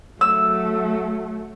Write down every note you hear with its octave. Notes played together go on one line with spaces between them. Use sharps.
F#3 A3 E6